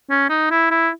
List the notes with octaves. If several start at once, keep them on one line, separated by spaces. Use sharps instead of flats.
C#4
D#4
E4
E4